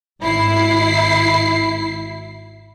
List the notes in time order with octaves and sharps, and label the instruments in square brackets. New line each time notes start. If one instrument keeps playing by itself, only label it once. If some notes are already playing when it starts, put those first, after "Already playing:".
[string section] G#1 E4 C7